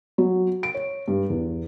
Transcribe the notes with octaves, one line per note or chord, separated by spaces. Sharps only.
F#3
D7
C#5
G2
E2